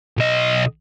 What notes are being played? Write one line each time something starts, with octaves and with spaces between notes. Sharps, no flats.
B1 D#5